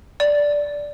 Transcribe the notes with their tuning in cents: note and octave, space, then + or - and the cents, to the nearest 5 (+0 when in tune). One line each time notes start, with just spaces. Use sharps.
D5 -5